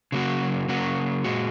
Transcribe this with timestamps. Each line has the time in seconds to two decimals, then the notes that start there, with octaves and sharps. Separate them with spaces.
0.12 C#3 F#3 A#3 F#4
0.69 C#3 F#3 A#3 F#4
1.24 A#2 G#3 F#4